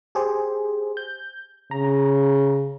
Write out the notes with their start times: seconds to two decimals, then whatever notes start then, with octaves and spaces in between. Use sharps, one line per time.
0.15 G4 G#4 C5
0.97 G6
1.71 C#3 A#5